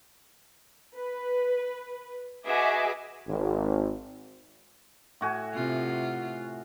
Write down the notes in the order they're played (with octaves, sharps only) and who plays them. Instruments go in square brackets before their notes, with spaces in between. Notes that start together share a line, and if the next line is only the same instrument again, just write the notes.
[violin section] B4
F#4 G#4 B4 D#5 E5 D6
[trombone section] G#1
[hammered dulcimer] A2 F#4 G#5
[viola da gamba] C3 F4